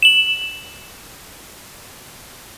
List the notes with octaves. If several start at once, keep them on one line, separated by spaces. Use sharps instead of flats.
E7 F#7